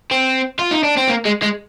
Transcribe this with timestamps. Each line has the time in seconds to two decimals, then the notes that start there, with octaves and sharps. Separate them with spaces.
0.11 C4
0.59 F4
0.71 D#4
0.83 D4
0.97 C4
1.09 A#3
1.26 G#3
1.42 G#3